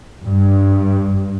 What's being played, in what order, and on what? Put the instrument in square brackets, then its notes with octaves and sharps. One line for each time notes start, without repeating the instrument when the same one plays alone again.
[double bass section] G2